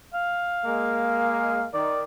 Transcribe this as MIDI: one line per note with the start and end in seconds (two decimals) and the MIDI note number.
0.14 1.68 77
0.66 1.65 56
0.66 1.65 58
1.74 2.04 51
1.74 2.03 74